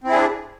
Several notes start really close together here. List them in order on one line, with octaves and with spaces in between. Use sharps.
C4 E4 G#4 D4